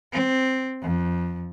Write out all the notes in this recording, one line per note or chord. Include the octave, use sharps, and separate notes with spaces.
C4
F2